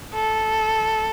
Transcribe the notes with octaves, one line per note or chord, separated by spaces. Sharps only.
A4